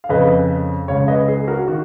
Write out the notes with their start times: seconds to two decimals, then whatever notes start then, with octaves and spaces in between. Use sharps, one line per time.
0.04 F5
0.09 F2 C#3 B4 D#5
0.88 C#2 C#3 C#5 F5
1.08 B4 D#5
1.28 G#4
1.47 F#4 A#4
1.68 D#3 F#4